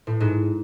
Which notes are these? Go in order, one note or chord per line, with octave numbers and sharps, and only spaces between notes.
A2
G#2